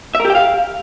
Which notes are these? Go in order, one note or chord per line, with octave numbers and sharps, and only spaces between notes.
E5
A#4
G4
G5
F5